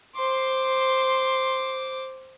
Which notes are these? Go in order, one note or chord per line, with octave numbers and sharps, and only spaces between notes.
C5 C6 D6